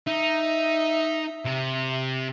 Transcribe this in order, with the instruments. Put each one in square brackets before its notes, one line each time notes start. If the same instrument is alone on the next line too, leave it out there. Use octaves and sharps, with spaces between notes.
[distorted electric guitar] D#4 [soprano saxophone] E5
[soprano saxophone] E5
[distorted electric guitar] C3